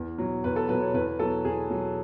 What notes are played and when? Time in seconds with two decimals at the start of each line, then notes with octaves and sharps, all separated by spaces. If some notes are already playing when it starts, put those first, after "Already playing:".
Already playing: E2
0.18 B2 F#3
0.44 E2 B4
0.56 A4
0.69 B2 F#3 B4
0.82 C#5
0.94 E2 B4
1.19 B2 F#3 A4
1.45 E2 G#4
1.70 B2 F#3